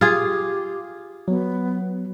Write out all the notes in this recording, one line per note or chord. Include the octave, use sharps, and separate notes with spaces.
F4 G4 G#4
F#3 B3